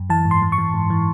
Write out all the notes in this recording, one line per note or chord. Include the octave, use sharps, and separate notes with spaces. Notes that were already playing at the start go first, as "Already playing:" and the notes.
Already playing: F#2
E3 A5
G#2
C6
E3
C#6
E3
G#2
E3